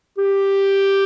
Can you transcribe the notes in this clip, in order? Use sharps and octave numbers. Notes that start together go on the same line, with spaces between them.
G4